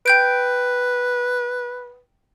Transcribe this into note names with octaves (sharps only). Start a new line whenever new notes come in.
B4 G5 G6 D7